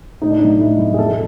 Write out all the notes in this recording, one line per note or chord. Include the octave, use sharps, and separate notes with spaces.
A2 D#4
D4
D#4
F#3 A3
A2 E4
F#3 A3 E4
G#4
F2 A4